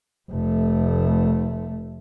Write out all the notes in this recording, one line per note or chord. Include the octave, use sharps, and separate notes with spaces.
F1 A3